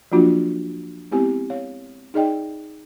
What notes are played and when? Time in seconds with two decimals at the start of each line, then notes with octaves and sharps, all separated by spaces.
0.12 F3 F#3 A#3 D4 F4 F#4
1.11 G#3 B3 C4 E4 G4 G#5
1.50 C#5 F5
2.14 D#4 G#4 D5 D#5 G5